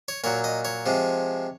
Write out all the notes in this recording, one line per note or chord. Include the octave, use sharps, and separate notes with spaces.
C#5
A#2 F#3 C#5
D#5
C#5
C3 F3 G#3